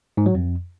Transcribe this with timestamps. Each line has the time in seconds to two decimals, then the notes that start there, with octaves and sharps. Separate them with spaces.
0.17 G#2
0.26 F#3
0.35 F2